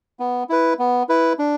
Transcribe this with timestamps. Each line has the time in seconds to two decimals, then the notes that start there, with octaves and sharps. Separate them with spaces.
0.20 B3
0.49 E4 B4
0.79 B3
1.09 E4 B4
1.39 D4